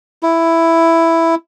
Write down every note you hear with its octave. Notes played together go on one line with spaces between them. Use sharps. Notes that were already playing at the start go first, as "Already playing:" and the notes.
E4